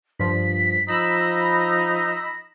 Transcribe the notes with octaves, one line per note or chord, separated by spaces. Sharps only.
G2 F3 B6
F3 D#4 B5 E6 A#6